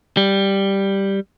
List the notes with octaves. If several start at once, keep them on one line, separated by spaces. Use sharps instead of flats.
G3